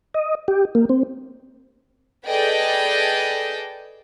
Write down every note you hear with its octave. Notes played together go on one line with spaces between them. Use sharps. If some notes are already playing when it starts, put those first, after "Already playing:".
D#5
G4
A#3
C4
G#4 A4 B4 D5 D#5 G5